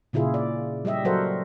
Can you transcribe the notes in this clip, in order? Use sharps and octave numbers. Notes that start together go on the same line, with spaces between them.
A#2 C#3 E4 F4 G#4
D5
G3 G4 D#5 E5
F#3 F#4 A4 A#4 C5 F#5